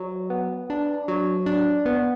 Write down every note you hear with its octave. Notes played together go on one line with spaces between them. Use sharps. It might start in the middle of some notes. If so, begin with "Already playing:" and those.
Already playing: F#3
B3
D4
F#3
D4
B3